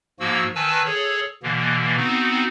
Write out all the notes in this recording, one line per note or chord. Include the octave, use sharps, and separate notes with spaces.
G#2 F3 A#3 F#4 E6
D#3 B4 G#5 A5 E6
G#4 A4 C#5
B2 D3 E3 A#3
B3 C4 D#4 F#4